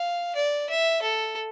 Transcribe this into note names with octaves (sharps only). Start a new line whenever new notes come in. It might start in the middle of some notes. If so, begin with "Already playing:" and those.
Already playing: F5
D5
E5
A4